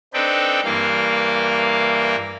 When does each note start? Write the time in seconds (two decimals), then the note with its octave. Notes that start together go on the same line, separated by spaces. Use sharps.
0.14 C4 D4 D#4 A4 B4 G5
0.64 G2 E3 A#3 F5